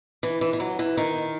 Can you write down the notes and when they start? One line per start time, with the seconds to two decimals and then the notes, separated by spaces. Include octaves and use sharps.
0.23 E3
0.41 E3
0.53 E3
0.60 F#3
0.79 E3
0.97 D#3